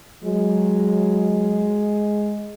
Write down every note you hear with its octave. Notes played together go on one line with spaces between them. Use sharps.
F#3 G#3